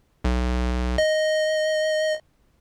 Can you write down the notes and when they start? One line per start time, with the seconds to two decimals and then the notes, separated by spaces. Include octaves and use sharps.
0.24 B1
0.98 D#5